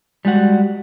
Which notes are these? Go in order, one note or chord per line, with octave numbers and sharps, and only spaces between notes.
G3 G#3 F#4 F#5